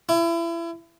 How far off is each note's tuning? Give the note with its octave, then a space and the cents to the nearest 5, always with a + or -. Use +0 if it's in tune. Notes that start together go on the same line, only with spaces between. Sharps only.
E4 +30